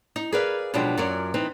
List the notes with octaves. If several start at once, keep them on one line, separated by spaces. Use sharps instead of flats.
D#4
G#4 A#4 B4 D5 F5
B2 F3 F#3 G#3 D4 G4
F#2 F#3 F4 A#4 D5
E3 C4 D#4